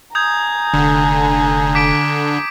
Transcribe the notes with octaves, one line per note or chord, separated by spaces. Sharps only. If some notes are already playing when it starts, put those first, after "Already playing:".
G#5 A#5 D#6 G6 G#6
F1 D3
D6 B6 D7